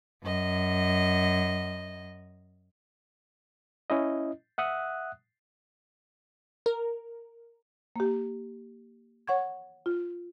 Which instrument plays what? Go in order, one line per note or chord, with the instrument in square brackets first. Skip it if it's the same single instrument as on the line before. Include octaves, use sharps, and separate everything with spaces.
[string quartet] F#2 D#5
[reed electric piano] C#4 E4 D#5
E5 F#5 D#6 F#6
[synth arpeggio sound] A#4
[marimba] A#3 G4
C#5 F#5 C#6 G#6
F4